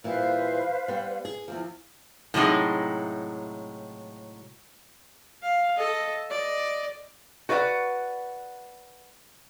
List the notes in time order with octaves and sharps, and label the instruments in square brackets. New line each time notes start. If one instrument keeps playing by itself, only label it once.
[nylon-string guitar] A#2 E3 G3 [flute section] B4 C5 F5
[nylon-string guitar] G3 B3
G#4
E2 G2 F3
[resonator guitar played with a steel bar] A2 C3 F#3 G#3 D#4
[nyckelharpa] F5
A4 D#5
D5 D#5
[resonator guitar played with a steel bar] F#4 B4 D5 E5 F#5